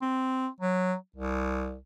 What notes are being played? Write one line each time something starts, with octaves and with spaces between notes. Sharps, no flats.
C4
F#3
C2